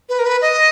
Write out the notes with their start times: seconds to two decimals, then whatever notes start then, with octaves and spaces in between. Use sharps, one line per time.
0.09 B4
0.19 A#4
0.26 B4
0.42 D#5